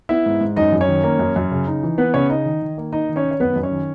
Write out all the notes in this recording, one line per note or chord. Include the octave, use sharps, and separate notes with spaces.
B3 E4 E5
G#2
G#2
F#2 D#4 D#5
F#2
C#4 C#5
D#3
A#3
F#2
F#2
C#3
D#4
E3
B3 B4
C#3 C#4 C#5
D#4 D#5
D#3
D#3
A#3
D#4 D#5
D#3
C#4 C#5
D#3
C#5
F#2 B3 B4
F#2
C#4 C#5
D#3